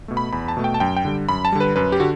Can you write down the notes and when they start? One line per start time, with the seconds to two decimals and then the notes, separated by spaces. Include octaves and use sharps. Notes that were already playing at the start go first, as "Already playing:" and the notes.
0.08 B2 A3
0.17 B5
0.33 E2 B5
0.48 A5
0.57 B2 A3
0.64 G5
0.74 A5
0.80 F#2 G5
0.96 G5
1.05 D3 G3
1.29 F#2 B5
1.45 A5
1.52 D3 G3
1.60 B4
1.76 F#2 B4
1.92 G4
2.00 D3 F#4